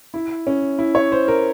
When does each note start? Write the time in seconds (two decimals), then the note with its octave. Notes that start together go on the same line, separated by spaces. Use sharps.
0.14 E4
0.47 C#4
0.79 E4
0.95 C#5
1.12 C5
1.28 A#4